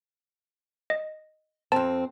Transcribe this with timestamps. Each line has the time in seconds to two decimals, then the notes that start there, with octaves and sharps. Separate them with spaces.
0.90 D#5
1.72 F2 C4 A5